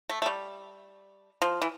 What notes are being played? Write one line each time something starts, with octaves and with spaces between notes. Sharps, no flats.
A3
A3
G3
F3
E3